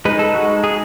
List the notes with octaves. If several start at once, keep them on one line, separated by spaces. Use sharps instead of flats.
G#3 D#4 B4
A4
F#4
G#4